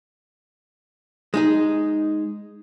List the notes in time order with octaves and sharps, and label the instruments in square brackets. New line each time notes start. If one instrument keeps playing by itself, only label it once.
[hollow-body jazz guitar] G#3 D#4 G#4